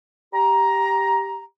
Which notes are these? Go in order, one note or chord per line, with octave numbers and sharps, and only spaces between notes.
G4 A#5